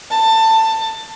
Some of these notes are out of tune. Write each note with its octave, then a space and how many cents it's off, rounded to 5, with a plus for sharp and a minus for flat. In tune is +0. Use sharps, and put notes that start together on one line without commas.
A5 +20